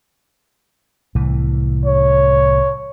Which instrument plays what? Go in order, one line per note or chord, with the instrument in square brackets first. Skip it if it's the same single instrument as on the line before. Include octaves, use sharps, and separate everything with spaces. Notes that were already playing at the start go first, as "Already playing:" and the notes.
[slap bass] C2 A2 E3
[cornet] C#5